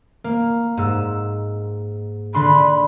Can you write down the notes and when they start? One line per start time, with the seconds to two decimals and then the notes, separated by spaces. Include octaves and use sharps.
0.24 A#3
0.77 G#2 E6
2.34 D3 B5 C6